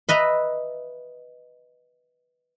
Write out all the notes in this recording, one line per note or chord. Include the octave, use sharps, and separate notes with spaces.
B4 D#5 E5 A#5